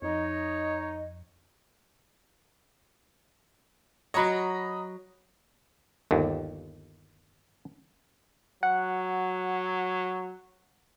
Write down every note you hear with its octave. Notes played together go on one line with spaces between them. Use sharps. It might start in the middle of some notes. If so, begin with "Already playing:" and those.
F2 D#4 C#5 D#5
F#3 F#4 C#5 D#5 A#5 B5
G1 D#2
F#3 F#5